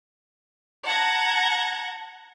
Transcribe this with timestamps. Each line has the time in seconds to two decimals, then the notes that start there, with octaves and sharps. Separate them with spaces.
0.86 F#5 A5 A#5 G#6 A#6